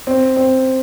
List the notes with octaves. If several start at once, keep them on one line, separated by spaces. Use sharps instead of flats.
C4
C4